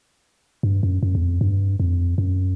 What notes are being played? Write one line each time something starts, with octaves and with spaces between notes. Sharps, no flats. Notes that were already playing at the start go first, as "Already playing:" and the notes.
G2
F#2
F#2
E2
F2
G2
F2
F#2